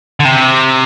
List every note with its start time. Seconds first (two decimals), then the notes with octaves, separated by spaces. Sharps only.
0.20 D3
0.25 C3